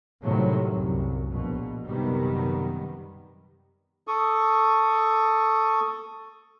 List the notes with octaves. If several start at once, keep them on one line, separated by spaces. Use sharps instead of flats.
A2 C3 D#3 F#3 G3
C2 F#2
A#1 B2
F#2 C3 D#3 G3 B3
A4 C#6 D#6